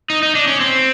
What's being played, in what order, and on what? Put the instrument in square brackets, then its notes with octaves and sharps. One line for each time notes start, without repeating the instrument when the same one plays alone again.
[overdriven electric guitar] D#4
D#4
D4
C#4
C4